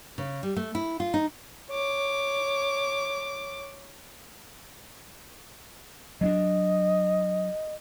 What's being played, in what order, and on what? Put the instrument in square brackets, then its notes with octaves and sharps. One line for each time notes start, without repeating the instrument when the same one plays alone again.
[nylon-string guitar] C#3
G3
A3
E4
F4
D#4
[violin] C#5 D6
[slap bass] F#3 C#4 D4 [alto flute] D#5